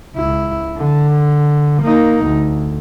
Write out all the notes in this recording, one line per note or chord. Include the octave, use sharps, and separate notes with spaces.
C#2 E4
D3
A#3 D#4
D2